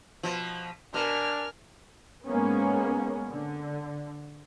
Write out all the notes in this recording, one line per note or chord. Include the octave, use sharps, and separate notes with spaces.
B2 F3
B2 D4 A#4 G#5 F6
G#2 G#3 A#3 B3 C#4
D3